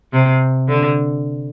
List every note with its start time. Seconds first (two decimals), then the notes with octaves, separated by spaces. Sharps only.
0.13 C3
0.69 D3